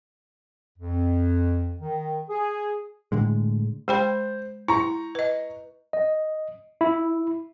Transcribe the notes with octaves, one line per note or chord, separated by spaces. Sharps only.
F2
D#3
G#4
A2 D3 G#3
G#3 C5 G5 B5
E4 A#5 C#6
B4 D#5
D#5
E4